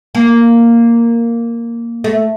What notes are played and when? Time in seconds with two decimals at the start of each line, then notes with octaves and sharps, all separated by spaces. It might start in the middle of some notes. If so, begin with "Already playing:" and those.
0.15 A#3
2.04 A3